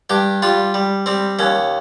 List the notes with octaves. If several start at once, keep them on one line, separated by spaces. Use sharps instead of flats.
G2 G4
G3 F4
G3
G3 C4
D#2 C#4